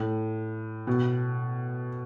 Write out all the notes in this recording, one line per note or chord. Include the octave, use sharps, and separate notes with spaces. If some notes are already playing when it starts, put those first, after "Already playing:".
Already playing: A2
B2